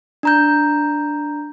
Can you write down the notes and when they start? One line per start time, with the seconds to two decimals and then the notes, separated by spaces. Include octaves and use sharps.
0.23 D4 A#5 G6